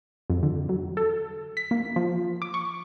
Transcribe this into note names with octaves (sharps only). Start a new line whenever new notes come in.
F2
D3
F#3
A4
B6
A#3
F3
D6
C#6